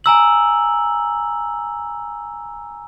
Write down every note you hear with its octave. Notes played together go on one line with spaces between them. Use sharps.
G#5 A#5 E6 F#7